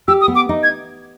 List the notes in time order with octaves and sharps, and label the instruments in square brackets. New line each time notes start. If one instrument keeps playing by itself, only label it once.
[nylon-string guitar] G4 [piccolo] E6
[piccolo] D#6
[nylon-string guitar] B3
[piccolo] D6
[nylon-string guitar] D#4
[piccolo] G#6